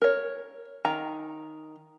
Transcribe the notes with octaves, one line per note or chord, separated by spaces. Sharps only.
A#4 C#5
D#3 A#5